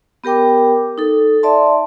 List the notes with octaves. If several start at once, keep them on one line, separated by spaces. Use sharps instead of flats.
B3 G4 A#4 G5 D6
D#4 A4
D5 E5 A5 C6